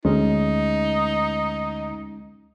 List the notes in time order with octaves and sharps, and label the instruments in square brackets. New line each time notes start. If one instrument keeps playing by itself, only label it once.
[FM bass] D2 [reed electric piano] G#3 C#4 [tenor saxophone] D#4